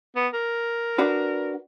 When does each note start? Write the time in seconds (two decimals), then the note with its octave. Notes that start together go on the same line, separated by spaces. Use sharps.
0.16 B3
0.34 A#4
0.98 D4 F#4 B4